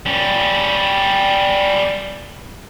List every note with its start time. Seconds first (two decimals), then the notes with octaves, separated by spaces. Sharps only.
0.06 G3 C#4